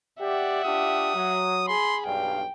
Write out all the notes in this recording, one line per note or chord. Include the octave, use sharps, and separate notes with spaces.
G4 D5 E5 F#5
D4 F4 G4 D#6
F#3
G#4 B5 C6
B1 G2 F5 G5